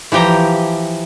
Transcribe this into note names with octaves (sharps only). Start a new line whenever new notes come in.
E3 F3 G4 G5 A#5